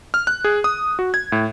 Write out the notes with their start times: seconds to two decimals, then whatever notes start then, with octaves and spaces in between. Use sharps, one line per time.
0.14 F6
0.27 F#6
0.44 G#4
0.64 D#6
0.99 F#4
1.14 G#6
1.32 A2